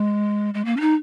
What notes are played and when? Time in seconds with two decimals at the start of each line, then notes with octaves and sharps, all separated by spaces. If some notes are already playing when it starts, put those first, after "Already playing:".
Already playing: G#3
0.54 G#3
0.65 A#3
0.77 C#4
0.80 D#4